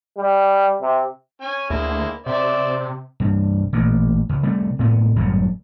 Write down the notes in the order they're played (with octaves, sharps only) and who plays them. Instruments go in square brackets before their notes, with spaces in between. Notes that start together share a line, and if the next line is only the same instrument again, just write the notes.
[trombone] G3
C3
[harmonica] C#4 G#5
[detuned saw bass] D2 [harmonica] G#3 A#3 E4
[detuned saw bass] C3 [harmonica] C5 D5 E5
[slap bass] C2 G2
A1 A#2
C#2
C3 G3 A3
A2 C3 G#3 B3
G1 F#2 A2 F#3